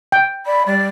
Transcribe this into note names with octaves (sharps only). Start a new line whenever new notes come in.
G5
D5 B5
G3 D5